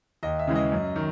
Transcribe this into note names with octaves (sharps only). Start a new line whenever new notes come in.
D#2 D#5
E5
C#3 E3 G#3
D#5
F#2
D#3